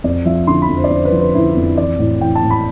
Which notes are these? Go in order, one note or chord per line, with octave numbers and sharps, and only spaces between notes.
F2 D5
F3 E5
D3 C6
B5
F2
C5
D5
F2 C5
B4
F3
B4
D3 E4
F2
E3 D5
A2
E3 G5
A5
A2
B5